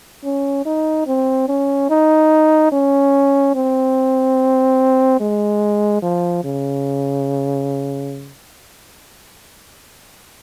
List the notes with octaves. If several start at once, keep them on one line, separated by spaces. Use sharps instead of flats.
C#4
D#4
C4
C#4
D#4
C#4
C4
G#3
F3
C#3